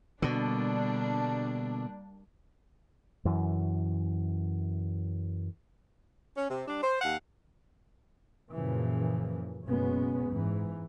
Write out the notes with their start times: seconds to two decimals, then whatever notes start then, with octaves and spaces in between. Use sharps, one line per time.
0.22 B2 D3 G3 A#3 D4
3.25 F#2 E3
6.37 C#4
6.50 C3
6.68 G3 D4
6.83 C5
7.01 D#2 F5 F#5
8.53 F#2 A#2 C#3 E3 F3
9.66 F#1 B2 G#3 B3 C#4
10.30 G#2 E3